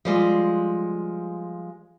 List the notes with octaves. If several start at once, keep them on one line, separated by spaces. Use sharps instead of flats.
F3 G3 G#3